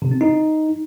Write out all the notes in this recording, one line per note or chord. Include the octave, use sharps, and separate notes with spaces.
C3
C4
D#4